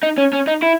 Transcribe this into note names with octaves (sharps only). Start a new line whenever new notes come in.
D#4
C#4
C#4
D#4
E4